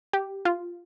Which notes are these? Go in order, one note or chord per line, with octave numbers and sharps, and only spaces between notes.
G4
F4